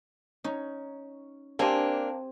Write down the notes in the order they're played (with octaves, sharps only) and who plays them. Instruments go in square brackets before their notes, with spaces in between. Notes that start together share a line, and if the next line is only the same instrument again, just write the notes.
[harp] C#4 [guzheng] D#4
[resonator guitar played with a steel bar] A#3 D4 [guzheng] C4 [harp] G4 C5 G#5